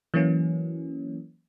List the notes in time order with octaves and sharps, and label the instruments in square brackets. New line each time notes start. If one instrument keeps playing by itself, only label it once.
[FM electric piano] E3 F#3 A#3 C#4